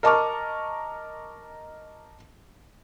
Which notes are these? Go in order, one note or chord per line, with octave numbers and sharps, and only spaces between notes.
A#4 D#5 A5 C#6 D6 F6